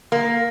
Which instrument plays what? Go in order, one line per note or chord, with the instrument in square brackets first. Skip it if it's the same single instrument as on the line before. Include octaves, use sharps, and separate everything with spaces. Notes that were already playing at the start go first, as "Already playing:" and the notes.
[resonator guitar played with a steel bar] A#3